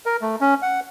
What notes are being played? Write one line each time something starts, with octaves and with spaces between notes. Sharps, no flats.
A#4
A3
C#4
F#5